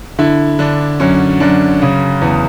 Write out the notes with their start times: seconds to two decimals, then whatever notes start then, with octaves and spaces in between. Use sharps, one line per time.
0.19 D3 E4
0.59 D3 D4
1.00 F#2 C#4
1.40 F#2 D4
1.82 C#3
2.21 E2